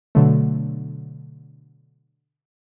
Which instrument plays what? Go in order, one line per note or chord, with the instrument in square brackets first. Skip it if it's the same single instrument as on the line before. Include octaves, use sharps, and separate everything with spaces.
[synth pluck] B2 D3 F#3 A3